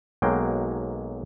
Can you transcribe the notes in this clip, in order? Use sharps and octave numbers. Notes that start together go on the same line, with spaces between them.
B1 F#3 G#3 A#3 G5